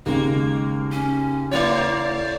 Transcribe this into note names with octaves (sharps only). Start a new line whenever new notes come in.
D#2 C#3 G#3 A#3
C#4
A3 E4 C#5 D5